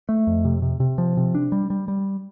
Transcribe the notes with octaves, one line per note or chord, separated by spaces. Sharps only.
A3
F2
C3
C3
C3
F3
C3
D4
G3
G3
G3